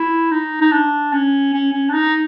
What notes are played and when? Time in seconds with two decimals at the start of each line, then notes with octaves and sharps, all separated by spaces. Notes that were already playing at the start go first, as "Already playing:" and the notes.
Already playing: E4
0.32 D#4
0.61 D#4
0.72 D4
1.13 C#4
1.54 C#4
1.73 C#4
1.90 D4
1.94 D#4